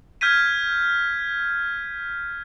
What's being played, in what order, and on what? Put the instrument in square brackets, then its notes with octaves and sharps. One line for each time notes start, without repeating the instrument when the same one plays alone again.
[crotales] F6 G6 G#6 B6 D#7